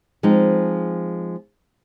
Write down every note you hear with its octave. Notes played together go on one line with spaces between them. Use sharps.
F3 G#3 C4 D#4